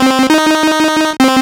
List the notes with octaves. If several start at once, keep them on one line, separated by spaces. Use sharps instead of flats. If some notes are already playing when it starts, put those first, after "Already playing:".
Already playing: C4
D#4
C4